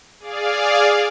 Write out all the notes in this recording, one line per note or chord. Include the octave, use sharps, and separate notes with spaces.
G#4 D5 F5